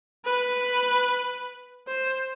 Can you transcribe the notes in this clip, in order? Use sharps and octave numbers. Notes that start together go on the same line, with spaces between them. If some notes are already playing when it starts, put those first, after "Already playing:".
B4
C5